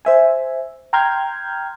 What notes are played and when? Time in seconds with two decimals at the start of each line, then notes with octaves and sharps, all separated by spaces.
0.05 C5 E5 G#5
0.93 G5 A#5 C6 F6 G6 G#6